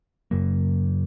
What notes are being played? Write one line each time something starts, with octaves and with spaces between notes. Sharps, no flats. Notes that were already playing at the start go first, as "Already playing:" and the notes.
F#2 C#3 F#3 A#3